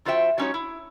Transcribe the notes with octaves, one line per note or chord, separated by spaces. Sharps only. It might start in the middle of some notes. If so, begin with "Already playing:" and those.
F2 F4 F#4 C5 E5 G5
F#3 G#3 C#4 D#4 G4 C#5
E4